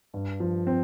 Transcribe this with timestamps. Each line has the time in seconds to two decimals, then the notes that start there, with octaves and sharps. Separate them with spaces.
0.14 G2
0.40 F3
0.67 C4